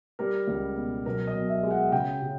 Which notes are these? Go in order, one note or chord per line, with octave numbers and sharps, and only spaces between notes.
G3 A#4
C#2
B2
B1 A#4
D#5
B1
E5
G#3
F#5
C#3 G5
C#3